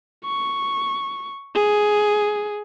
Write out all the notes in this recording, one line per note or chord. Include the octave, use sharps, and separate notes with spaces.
C#6
G#4